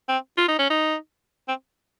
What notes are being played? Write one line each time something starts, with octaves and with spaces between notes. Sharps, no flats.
C4
F4
D#4
C#4
D#4
C4